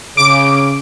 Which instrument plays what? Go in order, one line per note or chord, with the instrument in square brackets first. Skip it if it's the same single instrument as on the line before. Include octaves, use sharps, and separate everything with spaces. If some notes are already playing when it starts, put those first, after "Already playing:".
[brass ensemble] C#3 [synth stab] D6 D7